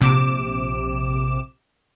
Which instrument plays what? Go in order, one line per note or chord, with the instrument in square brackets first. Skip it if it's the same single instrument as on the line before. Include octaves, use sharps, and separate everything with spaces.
[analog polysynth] A#1 C3 D6 E7